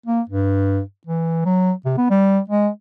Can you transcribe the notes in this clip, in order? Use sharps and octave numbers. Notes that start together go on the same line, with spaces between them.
A#3
G2
E3
F#3
C3
B3
G3
G#3